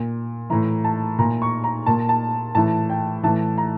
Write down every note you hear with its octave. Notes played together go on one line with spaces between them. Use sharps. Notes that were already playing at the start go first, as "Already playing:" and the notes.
Already playing: A#2
A2 E3 A#5
A5
A#2 A#5
C#6
A#5
A#2 A5
A5
A2 E3 A5
G5
A2 E3 A5
A#5